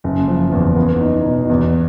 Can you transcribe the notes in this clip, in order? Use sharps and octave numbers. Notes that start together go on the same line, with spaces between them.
F#1
F3
E2
B3
D#4
B2
E2